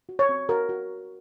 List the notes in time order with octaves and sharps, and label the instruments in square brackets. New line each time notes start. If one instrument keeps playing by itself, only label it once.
[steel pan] F#4
C#5
C4
F#4 A#4
F#4